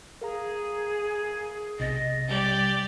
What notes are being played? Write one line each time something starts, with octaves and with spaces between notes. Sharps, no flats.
G#4 A#4 F5 A#5
B1 C3 D#5 A6
G3 G4 D5